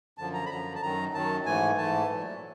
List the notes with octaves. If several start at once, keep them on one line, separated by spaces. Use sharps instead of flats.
F#2 D3 F3 A5
A#5
B5
F#2 D3 F3 A#5
A5
F#2 D#3 F#3 A#5
F#2 D#3 F#3 A5
G#2 E3 A3 G#5
G#2 E3 A3 A5
A#2 F#3 A3